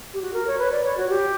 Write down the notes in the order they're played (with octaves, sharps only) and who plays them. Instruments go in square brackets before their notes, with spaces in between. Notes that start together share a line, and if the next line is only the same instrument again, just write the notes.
[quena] G4
F#4
A#4
C#5
B4
D5
C#5
F#4
G4